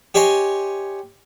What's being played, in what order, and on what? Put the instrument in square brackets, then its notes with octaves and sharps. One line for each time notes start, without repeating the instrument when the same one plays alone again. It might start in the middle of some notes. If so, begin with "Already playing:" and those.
[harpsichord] G4 C#5 D#5 G#5 C6